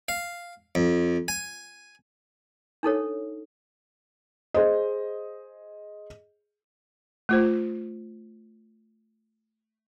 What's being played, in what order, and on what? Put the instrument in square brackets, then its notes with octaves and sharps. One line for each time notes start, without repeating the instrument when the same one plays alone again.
[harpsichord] F5
F2
G#5
[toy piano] D4 D#4 A4 C#5
[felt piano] G#4 C5 D#5
[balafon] A3 F4 C5